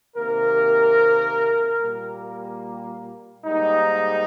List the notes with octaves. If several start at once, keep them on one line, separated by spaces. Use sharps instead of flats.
C3 D#3 A#3 A#4
A#2 G3 A#3
G#2 G3 A#3 D#4